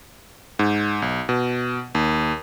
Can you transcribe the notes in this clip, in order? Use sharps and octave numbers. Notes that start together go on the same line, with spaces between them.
G#2
B1
B2
D#2